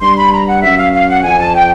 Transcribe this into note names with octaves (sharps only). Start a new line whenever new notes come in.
G2 C6
B5
A#5
F#5
F#2 E5
F5
F5
F#5
F2 G#5
A5
G5